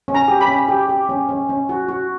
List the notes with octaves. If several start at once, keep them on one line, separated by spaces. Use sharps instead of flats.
C#4
A#5
G4
B5
C#4
G4
G4
C#4
C#4
C#4
F#4
F#4